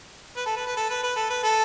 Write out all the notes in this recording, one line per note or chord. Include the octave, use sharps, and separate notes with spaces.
B4
A4
B4
B4
A4
B4
B4
A4
B4
A4